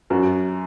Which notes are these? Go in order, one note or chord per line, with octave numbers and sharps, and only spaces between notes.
F#2 F#4